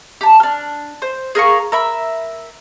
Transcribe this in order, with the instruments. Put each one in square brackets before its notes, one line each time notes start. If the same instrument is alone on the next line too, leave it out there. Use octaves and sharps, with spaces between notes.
[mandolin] G4 A5
D4 F6
C5
G#4 A#4 F5 C#6
A#4 E5 B5